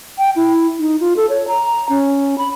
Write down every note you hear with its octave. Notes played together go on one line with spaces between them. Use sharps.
G5
E4
D#4
F4
A4
C#5
A#5
C#4
B5